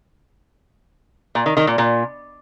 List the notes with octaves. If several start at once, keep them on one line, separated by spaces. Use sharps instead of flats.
A#2
D#3
D#3
A#2
A#2